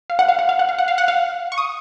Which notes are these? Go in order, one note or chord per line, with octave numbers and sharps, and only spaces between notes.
F5
F#5
F5
F#5
F5
F#5
F5
F#5
F5
F#5
F5
C#6
D#6